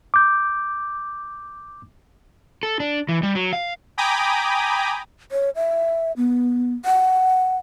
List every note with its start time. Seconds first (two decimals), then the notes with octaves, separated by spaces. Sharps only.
0.14 D6 G6
2.63 A4
2.80 D4
3.09 E3
3.23 G3
3.35 F#3
3.53 F5
3.98 G5 G#5 A#5 B5 D6 D#6
5.32 C#5
5.56 E5
6.17 B3
6.85 F#5